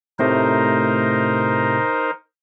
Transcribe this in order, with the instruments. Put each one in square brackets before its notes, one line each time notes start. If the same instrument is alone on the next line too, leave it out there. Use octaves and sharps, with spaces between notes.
[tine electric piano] A2 C3 A3 [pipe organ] D#4 A#4 C5